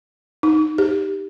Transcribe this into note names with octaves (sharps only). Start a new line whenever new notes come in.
D#4
G4